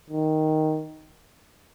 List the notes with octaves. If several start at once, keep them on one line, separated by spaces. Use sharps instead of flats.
D#3